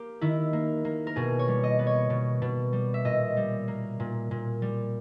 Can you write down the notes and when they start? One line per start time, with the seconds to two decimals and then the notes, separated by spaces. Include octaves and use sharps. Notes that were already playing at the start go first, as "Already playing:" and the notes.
Already playing: A#3 G4
0.21 D#3 E4
0.53 A#3
0.85 A#3
1.07 A#4
1.16 B2 G#4
1.39 C#5
1.48 G3
1.64 D#5
1.79 B3
1.87 C#5
2.10 B2
2.42 B2
2.73 G3
2.94 E5
3.05 A#2 D#5
3.37 G3
3.68 A#3
4.00 A#2
4.31 A#2
4.62 G3